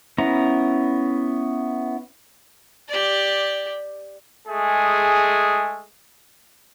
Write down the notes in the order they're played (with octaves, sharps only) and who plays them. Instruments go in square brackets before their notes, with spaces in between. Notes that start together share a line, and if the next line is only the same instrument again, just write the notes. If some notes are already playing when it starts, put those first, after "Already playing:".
[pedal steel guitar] B3 C#4 E4 A#5
[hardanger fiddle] G4 D5
[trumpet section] G#3 A3 G#4